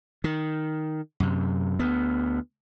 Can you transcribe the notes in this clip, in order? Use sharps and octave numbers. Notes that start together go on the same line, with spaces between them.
D#3
F#2 C3
D2 B3